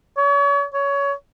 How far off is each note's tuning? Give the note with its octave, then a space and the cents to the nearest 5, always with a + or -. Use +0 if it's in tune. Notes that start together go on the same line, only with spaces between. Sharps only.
C#5 +40
C#5 +20